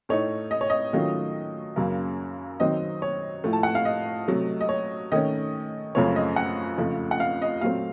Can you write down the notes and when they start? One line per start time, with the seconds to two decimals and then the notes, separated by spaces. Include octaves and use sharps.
0.09 A2 A3 D#4 C#5
0.51 D#5
0.61 C#5
0.70 D#5
0.93 D#3 F#3 A3 C#4 F4
1.76 F#2 C#3 F#3 A#3
2.60 D#3 F#3 C4 D#4 D#5
3.02 C#5
3.44 A2 F3 A3
3.53 A5
3.63 F#5
3.75 F5
3.85 D#5
4.28 C3 F#3 A3
4.61 D#5
4.69 C#5
5.12 D#3 A3 C#4 D#5
5.95 F#2 C#3 F3 A3 C4 C#5
6.16 D#5
6.36 F#5
6.78 F2 C#3 F3 A3
7.11 F#5
7.20 F5
7.42 D#5
7.61 A#2 F#3 A3 C4 F5